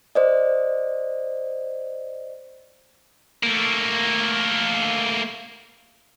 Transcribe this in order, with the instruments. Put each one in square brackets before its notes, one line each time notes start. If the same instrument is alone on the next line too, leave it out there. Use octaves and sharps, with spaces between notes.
[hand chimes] C5 D5 D#5
[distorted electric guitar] A3 A#3